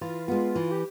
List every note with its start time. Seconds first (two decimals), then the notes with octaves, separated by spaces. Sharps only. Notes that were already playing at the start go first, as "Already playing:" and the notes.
0.01 E3 F4
0.28 G#3 B3 F4
0.54 E3 F4
0.71 G4